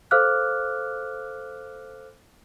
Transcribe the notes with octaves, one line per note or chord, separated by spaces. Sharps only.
A4 C5 F5 D6 F6 F#6